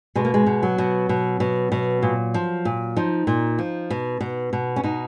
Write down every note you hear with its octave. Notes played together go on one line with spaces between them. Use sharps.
B2 G#3
A#3
G#3
B2
F#3
B2
B2
B2
B2
A#2
F3
A#2
F3 D#4
A#2
F3
B2
B2
B2
C#4
B2 D#4